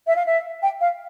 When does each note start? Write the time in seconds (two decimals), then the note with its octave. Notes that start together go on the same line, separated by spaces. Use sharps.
0.07 E5
0.16 F5
0.26 E5
0.62 G5
0.81 F5